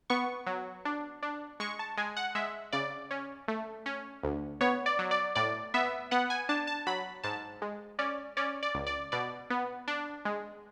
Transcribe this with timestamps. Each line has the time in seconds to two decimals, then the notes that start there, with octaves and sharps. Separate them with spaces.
0.10 B3 C#6
0.47 F#3
0.85 D4
1.23 D4
1.60 G#3 C#6
1.79 A5
1.97 G#3 G#5
2.17 F#5
2.35 G#3 E5
2.72 C#3 D5
3.11 C#4
3.48 A3
3.86 C#4
4.23 D2
4.61 B3 C#5
4.86 D5
4.99 F#3
5.11 D5
5.35 A2 D5
5.74 B3 E5
6.11 B3 F#5
6.30 G#5
6.49 D4 A5
6.67 A5
6.87 F#3 B5
7.23 G#2 A5
7.62 G#3
7.99 C#4 D5
8.37 C#4 D5
8.63 D5
8.74 C#2
8.87 D5
9.12 B2 D5
9.50 B3
9.88 D4
10.25 G#3